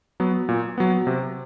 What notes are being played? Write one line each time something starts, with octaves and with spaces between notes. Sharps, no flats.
F#3 B3
A#2
F#3 B3
C3